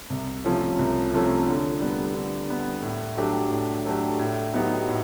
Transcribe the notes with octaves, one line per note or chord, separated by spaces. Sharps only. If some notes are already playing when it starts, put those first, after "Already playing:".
C2
C3 F3 A3 C#4
C2
C3 F3 A3 C#4
D3
G3 B3
D3
G3 B3
A2
F#3 A3 D4 G4
A2
F#3 A3 D4 G4
A2
F#3 B3 D#4 G4
A2